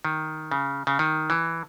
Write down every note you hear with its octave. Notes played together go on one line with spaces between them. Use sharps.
D#3
C#3
C#3
D#3
E3